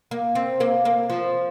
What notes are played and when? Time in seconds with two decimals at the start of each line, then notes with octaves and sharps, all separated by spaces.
0.11 A#3
0.35 C4
0.60 A#3
0.85 A#3
1.10 F3